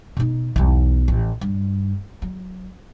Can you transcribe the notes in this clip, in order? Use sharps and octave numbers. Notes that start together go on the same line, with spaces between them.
B2 D#4
B1 E2
A1
G2
F#3